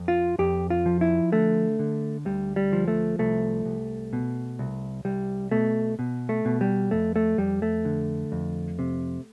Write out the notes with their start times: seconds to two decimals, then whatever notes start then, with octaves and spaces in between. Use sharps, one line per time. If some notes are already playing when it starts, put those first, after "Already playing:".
Already playing: F2
0.08 F4
0.39 F2 G4
0.70 F4
0.86 F3
1.01 E4
1.32 D3 A3
1.79 D3
2.25 D2 G3
2.56 G3
2.73 F3
2.88 A3
3.19 C2 A3
3.65 C2
4.13 B2
4.59 C2
5.05 C2 G3
5.51 B2 A3
5.99 B2
6.29 A3
6.45 B2
6.61 G3
6.91 F2 A3
7.16 A3
7.38 F2 G3
7.62 A3
7.85 D3
8.32 F2
8.79 C3